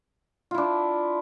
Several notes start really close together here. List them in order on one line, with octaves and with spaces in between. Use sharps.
F4 E4 D4